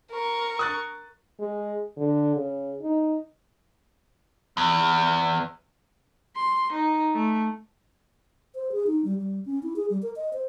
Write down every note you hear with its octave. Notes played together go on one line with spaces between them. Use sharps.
A#4 C#6
D#6 F#6 A6
G#3
D3
C#3
D#4
E2
C6
D#4
A3
C5
G#4
D#4
G3
G3
C#4
E4
G#4
G3
A#4
D#5
C5